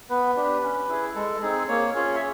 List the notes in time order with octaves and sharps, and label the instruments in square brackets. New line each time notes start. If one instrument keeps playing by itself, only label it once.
[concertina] B3 B4
D4 G4
C#4
E4 G#4
G#3 A4
C4 D#4 G#4
A#3 C#5
C#4 F4 G#4 C#5
E5